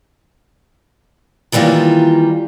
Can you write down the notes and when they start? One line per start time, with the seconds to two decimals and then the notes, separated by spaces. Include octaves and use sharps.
1.52 D#3 E3 G3 A#3 F4